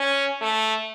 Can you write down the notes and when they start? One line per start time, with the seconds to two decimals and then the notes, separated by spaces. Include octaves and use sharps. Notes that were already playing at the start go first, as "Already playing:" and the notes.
Already playing: C#4
0.41 A3